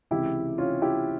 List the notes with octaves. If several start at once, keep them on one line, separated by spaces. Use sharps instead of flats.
C#2 C3 E3 E4 G4
C#4 F4
E4 G4